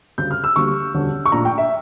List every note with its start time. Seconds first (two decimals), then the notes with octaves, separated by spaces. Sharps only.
0.18 D2 C#3 G3 G6
0.31 F6
0.44 E6
0.56 D2 D3 G3 A#3 C#6
0.94 E1 D2 D3 G3 C#4
1.25 C#6
1.32 A#1 A#2 A3 D4 A#5
1.45 G5
1.58 E5